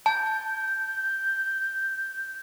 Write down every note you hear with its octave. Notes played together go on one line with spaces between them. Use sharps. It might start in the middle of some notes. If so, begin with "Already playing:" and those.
A5 G6